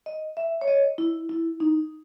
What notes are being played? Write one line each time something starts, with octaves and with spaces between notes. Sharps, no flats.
D#5
E5
C#5
D#5
E4
E4
D#4